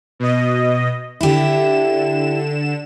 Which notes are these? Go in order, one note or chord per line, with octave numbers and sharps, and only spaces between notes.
B2 D#5
D3 E4 G4 E7